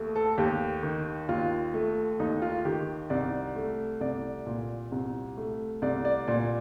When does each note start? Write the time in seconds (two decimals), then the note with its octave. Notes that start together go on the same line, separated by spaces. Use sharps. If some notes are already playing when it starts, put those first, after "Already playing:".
Already playing: D#2 A3
0.16 A4
0.38 D#2 G4
0.83 D#3
1.29 D#2 F4
1.74 A3
2.20 D#2 D#4
2.42 F4
2.65 D#3 G4
3.10 C2 D5
3.56 A3
4.01 C2 D5
4.46 A#2
4.92 C2
5.37 A3
5.82 C2 D5
6.05 D5
6.28 A#2 D5